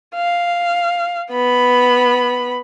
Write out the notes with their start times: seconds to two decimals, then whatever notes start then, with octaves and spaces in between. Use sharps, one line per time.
0.15 F5
1.32 B3 B5